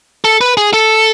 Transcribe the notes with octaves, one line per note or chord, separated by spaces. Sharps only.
A4
B4
G#4
A4